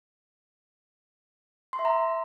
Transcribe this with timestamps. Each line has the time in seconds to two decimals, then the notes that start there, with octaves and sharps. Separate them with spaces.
1.73 C6
1.79 E5
1.85 A#5